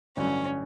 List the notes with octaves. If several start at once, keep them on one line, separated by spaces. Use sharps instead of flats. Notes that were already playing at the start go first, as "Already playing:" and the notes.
A1 G2 D3 F#3 C#4